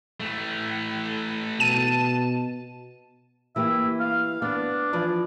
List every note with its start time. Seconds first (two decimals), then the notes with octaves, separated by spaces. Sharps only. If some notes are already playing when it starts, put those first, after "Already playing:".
0.20 E3 A3
1.60 B2 A5 D#7
3.56 E3 A#3 G4 E5
3.99 F5
4.42 B3 D4
4.93 E3 F3 D5